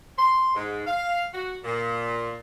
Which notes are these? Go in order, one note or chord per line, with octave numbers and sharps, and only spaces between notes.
C6
G#2
F5
F#4
A#2